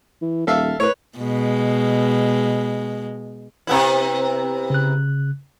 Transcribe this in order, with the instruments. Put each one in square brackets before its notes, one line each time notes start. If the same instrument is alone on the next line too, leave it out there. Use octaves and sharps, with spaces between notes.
[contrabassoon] E3
[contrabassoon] D#1 [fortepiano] A4 E5 F5
[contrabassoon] A2 [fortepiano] B4 C#5
[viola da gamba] B2 G#3
[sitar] C3 B3 E4
[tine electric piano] C#3 F#6